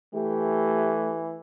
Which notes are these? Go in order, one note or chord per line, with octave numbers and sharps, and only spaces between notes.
E3 A3 G4